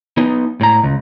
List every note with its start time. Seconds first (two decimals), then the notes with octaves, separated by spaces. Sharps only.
0.17 B3 D#4
0.61 A2 A#5
0.83 C#2